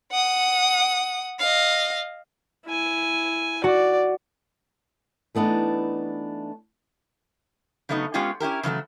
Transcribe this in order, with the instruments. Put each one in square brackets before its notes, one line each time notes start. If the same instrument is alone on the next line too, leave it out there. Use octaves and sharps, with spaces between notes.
[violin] F#5 D#6
D#5 F5
[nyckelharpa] E4 G#5
[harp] F#4 [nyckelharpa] D5
[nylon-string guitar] E3 A3 B3 D4 D#4
[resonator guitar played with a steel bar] C#3 F#3 A3 B3 D#4
G#3 B3 C#4 F4 G4 G#4
C#4 E4 G4 A#4
C#3 E3 F#3 A3